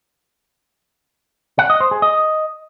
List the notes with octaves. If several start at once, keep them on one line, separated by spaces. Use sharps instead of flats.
F#5
D#5
C5
G#4
D#5